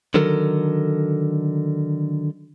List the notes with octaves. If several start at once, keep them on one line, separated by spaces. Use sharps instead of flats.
D3 D#3 F#3 A4 A#4